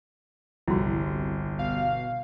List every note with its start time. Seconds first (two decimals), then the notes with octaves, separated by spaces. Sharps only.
0.68 G1 C2 E4 F#4
1.59 B2 F5